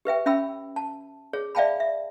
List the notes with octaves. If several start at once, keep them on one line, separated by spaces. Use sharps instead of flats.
G4 B4 E5 G5
C#4 E5 G5 B5 E6
A5
G#4 C#5
D5 E5 F5 G5 A5 B5
E5